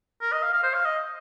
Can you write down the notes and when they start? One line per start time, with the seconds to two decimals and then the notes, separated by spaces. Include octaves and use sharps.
0.22 A#4
0.32 D#5
0.43 F5
0.54 F5
0.63 C5
0.74 F5
0.85 D#5